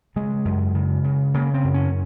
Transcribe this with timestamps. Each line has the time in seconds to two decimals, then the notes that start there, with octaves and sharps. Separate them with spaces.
0.16 C#3 G#3
0.45 F#2
0.74 C#3
1.04 C#3
1.34 C#3 A#3
1.54 C4
1.64 F#2
1.74 C#4